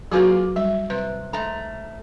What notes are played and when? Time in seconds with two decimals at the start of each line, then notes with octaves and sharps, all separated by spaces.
0.11 F#3 A#3 F4 F#4 G#4 B4
0.56 G3 E5
0.90 C3 B4
1.33 G#2 A3 A#5